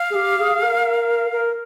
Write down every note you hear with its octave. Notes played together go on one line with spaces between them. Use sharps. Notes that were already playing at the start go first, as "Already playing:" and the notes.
Already playing: F5
G#4
G4
G#4
G#4
A#4
A#4